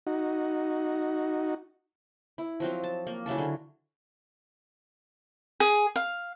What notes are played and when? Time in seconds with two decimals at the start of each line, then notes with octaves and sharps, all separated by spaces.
0.07 D#4 F#4
2.38 E4
2.60 F3 F#3 C4
2.83 A5
3.07 A#3
3.26 C#3 F#3 E4 A5
3.38 D3
5.60 G#4
5.96 F5